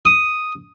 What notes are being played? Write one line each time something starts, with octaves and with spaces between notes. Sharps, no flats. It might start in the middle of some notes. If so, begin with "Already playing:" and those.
D#6